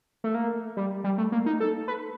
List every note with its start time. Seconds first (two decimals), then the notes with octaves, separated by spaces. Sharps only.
0.24 A3
0.34 A#3
0.77 G3
1.04 G3
1.18 A3
1.32 A#3
1.46 D#4
1.60 A4
1.88 B4